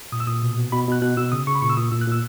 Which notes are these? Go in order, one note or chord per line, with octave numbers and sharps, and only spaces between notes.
A#2 D#6
E6
A#2 D#6
B2
B2
B2 B5
B2 F#6
B2 F#6
B2 E6
C#3 D#6
C#3 C#6
B5
A#2 C#6
E6
A#2 D#6
A#2 E6
F#6
A#2 E6